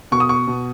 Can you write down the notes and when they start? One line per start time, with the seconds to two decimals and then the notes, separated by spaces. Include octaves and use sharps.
0.12 B2 C#6
0.20 D#6
0.29 C#6
0.47 B2